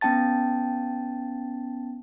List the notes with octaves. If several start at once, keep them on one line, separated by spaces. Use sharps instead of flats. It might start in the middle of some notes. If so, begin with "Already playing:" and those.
B3 C#4 G5 A5 A6